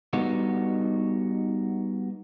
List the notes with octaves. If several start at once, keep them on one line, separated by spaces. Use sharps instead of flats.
G3 B3 D#4 F#4